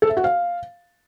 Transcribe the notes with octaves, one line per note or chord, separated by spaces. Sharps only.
A4
E5
F#4
F5